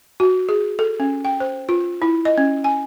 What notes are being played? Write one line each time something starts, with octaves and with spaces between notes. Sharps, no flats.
F#4
G#4
A4
C#4
G5
C5
F4
E4
D#5
C#4
G#5